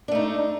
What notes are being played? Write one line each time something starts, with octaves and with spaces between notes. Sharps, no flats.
A3 D4 D#4